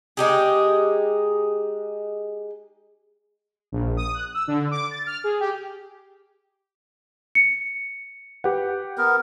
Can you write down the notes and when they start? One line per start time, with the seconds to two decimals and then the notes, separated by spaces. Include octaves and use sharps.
0.17 G#3 D#4 G4 G#4
3.72 A#1
3.97 D#6
4.14 F#6
4.34 E6
4.48 D3
4.71 D6
4.91 A6
5.07 F6
5.24 G#4
5.40 G4
7.35 C#7
8.44 G4 B4 F#5
8.98 B3 A#4